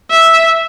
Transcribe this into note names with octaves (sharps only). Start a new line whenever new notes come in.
E5